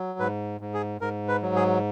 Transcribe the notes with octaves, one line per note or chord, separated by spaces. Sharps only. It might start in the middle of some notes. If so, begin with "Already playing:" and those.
Already playing: F#3
G#2 B4
G#2
G#4
G#2 A#4
B4
F#3
G#4